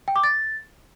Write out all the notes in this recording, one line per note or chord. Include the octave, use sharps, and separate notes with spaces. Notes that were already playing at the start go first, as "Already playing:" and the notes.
G5
D6
A6